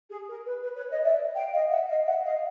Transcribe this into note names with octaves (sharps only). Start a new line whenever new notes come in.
G#4
A#4
B4
B4
B4 C#5
C#5 D#5
D5 E5
F5 G5
D#5 F5
E5 F#5
D#5 F5
E5 F#5
D#5 F5